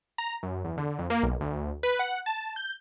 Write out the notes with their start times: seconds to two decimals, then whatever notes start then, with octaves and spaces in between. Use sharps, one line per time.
0.18 A#5
0.43 F#2
0.65 E2
0.77 D3
0.99 F2
1.10 A#3
1.23 B1
1.41 D2
1.83 B4
1.99 F#5
2.26 A5
2.56 G6